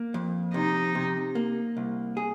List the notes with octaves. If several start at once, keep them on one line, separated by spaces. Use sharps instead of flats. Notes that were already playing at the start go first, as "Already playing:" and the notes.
Already playing: A#3
F2
C3 D#4
C3
A#3
C2
G#4